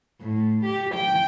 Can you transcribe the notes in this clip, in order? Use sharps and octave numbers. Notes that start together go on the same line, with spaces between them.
A2
G4
G5